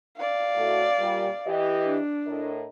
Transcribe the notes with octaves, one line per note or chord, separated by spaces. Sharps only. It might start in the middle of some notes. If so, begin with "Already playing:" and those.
D5 F5
A2 A3 F#4
A#2 G3
E3 G4 D#5
D4
A2 A#4 D#5